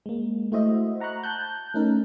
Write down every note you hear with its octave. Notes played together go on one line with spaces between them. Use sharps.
G#3 A#3
A3 E4 F#4 C5 D#5 E5
F#5 A#5 B5 C#6 F#6
A5 F#6 G6
A3 C#4 D#4 A#4